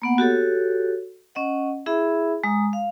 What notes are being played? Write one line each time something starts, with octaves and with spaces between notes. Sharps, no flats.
A#3 B3 F#5
F#4 G4 A4 C#5
C#4 D#5 F#5
E4 G#4 E5 B5
G#3 A#5 D#6
F5